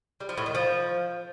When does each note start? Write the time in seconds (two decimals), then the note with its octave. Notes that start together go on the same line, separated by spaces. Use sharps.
0.20 G3
0.29 F3
0.38 A2
0.46 D#3
0.55 F3